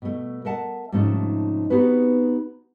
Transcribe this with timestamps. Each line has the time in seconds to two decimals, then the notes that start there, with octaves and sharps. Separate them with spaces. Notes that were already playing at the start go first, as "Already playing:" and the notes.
0.02 B2 A3
0.45 A#4 D#5 E5 F#5 A5
0.92 G#2 C3 F3 A3 C#4 D#4
1.70 B3 C4 D#4 F#4 G4 B4